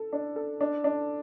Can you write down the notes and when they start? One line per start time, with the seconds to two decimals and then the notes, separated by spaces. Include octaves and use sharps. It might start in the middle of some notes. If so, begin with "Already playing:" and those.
Already playing: A4
0.13 D4
0.36 A4
0.61 D4
0.84 D4